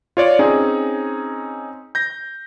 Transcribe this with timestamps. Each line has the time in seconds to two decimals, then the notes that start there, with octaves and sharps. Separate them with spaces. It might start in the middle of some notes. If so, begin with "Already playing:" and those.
0.17 F4 C#5 D5
0.39 C4 C#4 D#4 G#4
1.95 G6 A#6